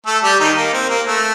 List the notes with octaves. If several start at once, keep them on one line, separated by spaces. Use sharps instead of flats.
A3 A4
G3 G4
D#3 D#4
A#3
C4
A#3
A3